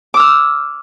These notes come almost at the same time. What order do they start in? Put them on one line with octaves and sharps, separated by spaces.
D6 E6 F6